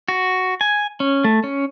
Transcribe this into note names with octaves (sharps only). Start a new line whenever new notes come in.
F#4
G#5
C#4
A3
C#4